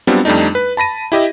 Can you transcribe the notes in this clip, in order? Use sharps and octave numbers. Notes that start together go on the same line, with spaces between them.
F#3 G3 B3 C4 D4 F4
F2 G3 A3 D4 D#4
B4
A5 B5 A#6 D#7
E4 G4 D#5 E5